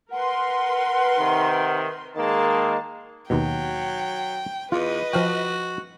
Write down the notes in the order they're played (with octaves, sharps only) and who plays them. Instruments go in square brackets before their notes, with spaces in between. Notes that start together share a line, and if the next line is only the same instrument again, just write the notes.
[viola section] A#4 B4 C6 [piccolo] F#5
[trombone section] C3 D#3
[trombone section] D#3 G#3 A#3 [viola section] A5
[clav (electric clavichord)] D#2 B2 [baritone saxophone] F#3 [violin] G5
[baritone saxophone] E2 [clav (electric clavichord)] F4 [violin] B4 D#5
[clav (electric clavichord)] F3 F5 G5 [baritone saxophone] F#4